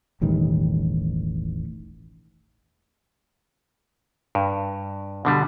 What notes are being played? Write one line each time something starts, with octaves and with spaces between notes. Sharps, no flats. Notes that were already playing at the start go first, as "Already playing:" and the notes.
E1 A1 D#3 G3
G2
B2 D3 G3